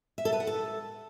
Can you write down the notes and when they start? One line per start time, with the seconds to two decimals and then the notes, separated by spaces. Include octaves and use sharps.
0.18 E5
0.25 A4
0.33 B4
0.40 F#5
0.47 A4